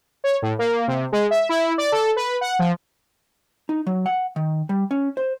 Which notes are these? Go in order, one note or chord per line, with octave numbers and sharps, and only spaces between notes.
C#5
A2
A#3
C3
G#3
E5
E4
D5
A4
B4
F#5
F3
D#4
F#3
F#5
D#3
G3
C#4
C5